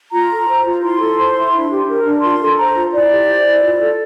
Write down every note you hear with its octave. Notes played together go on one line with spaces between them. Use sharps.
F4 A#5
A4
C5
F4
E4 C6
A4
C5
E4
D4
G4
A#4
D4
F4 C6
A4
C5 A#5
F4
E4 D5
G4
C5
E4
F4
A4